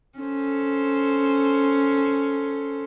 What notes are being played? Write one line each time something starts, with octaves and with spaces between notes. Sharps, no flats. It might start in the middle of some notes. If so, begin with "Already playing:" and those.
C#4 A4 C5